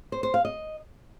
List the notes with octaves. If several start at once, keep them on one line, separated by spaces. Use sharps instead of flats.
C5
C5
F5
D#5